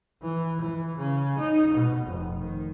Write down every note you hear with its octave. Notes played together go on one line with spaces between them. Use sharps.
E3
E3
C#3
D#4
B2
F1
D#3